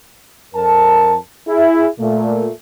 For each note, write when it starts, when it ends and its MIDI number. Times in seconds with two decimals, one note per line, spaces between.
0.55 1.15 41
0.55 1.15 70
0.55 1.15 81
1.48 1.88 64
1.48 1.88 68
2.00 2.50 46
2.00 2.50 57